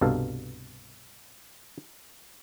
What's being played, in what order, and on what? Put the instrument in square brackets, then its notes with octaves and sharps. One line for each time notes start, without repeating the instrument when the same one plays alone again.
[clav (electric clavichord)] C2 G2 B2 A4 F5